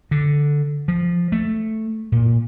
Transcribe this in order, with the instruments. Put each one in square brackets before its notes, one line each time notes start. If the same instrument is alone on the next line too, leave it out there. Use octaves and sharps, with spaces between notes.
[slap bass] D3
F3
A3
A#2